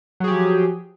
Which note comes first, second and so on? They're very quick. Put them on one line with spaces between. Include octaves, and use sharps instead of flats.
F#3 G#4 G4 F3